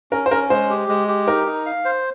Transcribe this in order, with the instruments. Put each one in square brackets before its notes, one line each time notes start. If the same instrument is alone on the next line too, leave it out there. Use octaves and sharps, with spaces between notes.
[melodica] C#4 [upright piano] A#4
[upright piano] C5
[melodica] C#4 [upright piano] A#4
[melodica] G#3 [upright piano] C5
[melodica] G4
G#3
G4
[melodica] D#4 [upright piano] A#4
[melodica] D#4
F5
C5